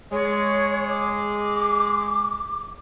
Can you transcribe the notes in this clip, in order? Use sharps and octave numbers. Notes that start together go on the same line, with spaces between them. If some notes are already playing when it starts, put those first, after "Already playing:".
G#3 C#5
D6